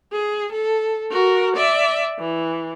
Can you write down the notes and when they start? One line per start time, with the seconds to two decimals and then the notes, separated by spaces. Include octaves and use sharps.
0.12 G#4
0.52 A4
1.11 F#4 A#4
1.56 D5 E5
2.19 E3